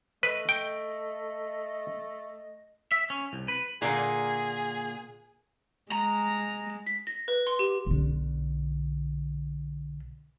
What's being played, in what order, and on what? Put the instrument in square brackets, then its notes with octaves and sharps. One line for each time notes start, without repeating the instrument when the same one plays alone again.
[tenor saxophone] A3 [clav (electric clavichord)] B4 [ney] D#5
[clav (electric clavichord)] G5
[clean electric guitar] E5
C#4
C2
B4
[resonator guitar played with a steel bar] A#2 D3 A#3 [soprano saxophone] G#4
[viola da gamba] G#3 [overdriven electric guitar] A#5
[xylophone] B6
A#6
B4
C6
G4
[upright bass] B1 D3